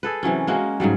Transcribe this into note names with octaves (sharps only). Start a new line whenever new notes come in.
G#4 A4 B4
C3 E3 F#3 C#4
G#3 A#3 C#4 F#4
G#2 C#3 F#3 G3